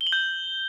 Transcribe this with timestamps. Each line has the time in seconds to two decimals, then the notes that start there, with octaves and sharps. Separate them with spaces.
0.01 G7
0.07 F#7
0.12 G6